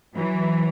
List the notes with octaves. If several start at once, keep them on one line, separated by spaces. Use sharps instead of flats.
E3 F#3